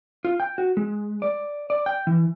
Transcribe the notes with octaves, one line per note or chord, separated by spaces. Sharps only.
F4
G5
F#4
G#3
D5
D5
G5
E3